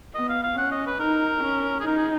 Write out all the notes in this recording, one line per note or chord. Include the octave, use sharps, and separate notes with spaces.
B3 D#5
F5
F5
C#4 F#5
D#5
B4
D#4 A#4
C#4
G#4
D#4 A#4
G#4